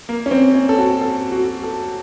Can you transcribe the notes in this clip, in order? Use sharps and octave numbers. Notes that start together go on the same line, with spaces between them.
A#3
C#4
C4
C#4
A4
F#4
A4
F#4
A4